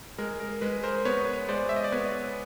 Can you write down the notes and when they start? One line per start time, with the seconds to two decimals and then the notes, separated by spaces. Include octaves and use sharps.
0.18 G#3 A#4
0.40 A#4
0.61 G#3 B4
0.83 A#4 C5
1.05 B3 B4 C#5
1.49 G#3 C5 D5
1.69 E5
1.76 D#5
1.84 D5
1.92 B3 B4 C#5